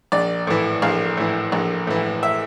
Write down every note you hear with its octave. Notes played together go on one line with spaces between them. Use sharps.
A#1 D5
A2 E3
A#1 F5
A2 E3
A#1
A2 E3
E5